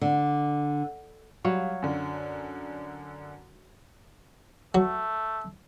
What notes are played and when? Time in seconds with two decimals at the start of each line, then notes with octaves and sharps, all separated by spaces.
0.01 D3
1.45 F#3 G3 C#5 F5
1.82 F#2 D3
4.75 F#3 A3